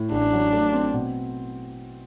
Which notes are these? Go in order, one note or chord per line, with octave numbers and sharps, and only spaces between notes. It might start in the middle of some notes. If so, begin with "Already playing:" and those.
Already playing: A2
A1 D4
F#3
A3
C4
B2